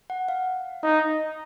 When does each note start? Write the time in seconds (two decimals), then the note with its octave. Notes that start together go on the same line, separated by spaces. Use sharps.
0.10 F#5
0.29 F5
0.83 D#4 D#5